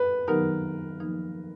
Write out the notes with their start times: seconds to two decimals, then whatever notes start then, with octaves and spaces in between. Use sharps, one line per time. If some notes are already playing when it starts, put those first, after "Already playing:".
Already playing: B4
0.27 D#3 F#3 B3 D#4 G4 A#4
1.00 F3 A#3 D#4